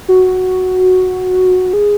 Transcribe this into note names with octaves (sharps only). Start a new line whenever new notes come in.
F#4
G#4